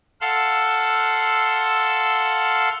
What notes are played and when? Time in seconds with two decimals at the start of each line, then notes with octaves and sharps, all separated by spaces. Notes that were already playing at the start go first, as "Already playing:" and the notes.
0.21 A4 F5 F#5 C6 E6